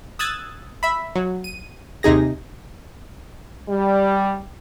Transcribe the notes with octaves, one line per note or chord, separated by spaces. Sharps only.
D#6 E6 F#6 G#6 A6
E5 B5
F#3
D#7
D#2 C3 D#4 G#4 A#6
G3